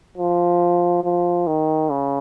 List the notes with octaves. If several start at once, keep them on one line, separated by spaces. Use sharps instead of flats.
F3
F3
D#3
C#3